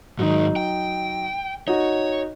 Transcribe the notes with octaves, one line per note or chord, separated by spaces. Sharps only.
G#2 D#3 F#3 D#4
G5
D#4 F#4 C#5